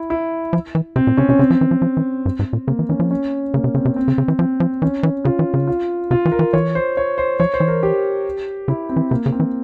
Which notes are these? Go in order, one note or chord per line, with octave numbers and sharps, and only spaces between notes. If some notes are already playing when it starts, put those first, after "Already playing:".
Already playing: E4
E4
F3
E3
C3 C4
A#2
C#3 C#4
C3 C#4
C#3 C4
F3
E3
F3
F3
E3
G2
G#2
A#2
C#3 A#3
E3
E3 C#4
F3
C#4
C#3 A#3
C3
C#3 C4
C3
C4
C#3
C#3
E3
F3 C4
F3
E3 C#4
E3
C#3 F4
E3
C#3
F4
C3 F4
E3
A#4
E3
E3 C#5
C5
C#5
C5
F3 C#5
C5
E3
A#4
G4
C#3 E4
C4
E3
C3 A#3
C#3
C4
E3